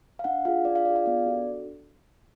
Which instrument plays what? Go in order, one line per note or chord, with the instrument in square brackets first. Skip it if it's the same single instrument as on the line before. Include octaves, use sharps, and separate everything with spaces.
[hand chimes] F5
D4 F#5
F4 G#4 F5
D4 D5
F5
F4 G#4 D5
F5
B3 D5
D4 F#4 A4